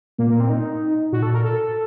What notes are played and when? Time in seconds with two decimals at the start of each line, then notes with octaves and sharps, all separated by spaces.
0.18 A#2 A#3
0.30 A#3
0.40 C4
0.50 D#4
1.12 A#2 F#4
1.23 A4
1.34 A#4
1.44 A4